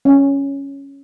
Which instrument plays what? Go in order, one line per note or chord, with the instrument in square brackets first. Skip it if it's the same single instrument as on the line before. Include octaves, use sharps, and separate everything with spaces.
[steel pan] C#4